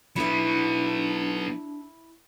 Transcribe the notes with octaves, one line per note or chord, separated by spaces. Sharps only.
F#3 B3 D4 E4 E5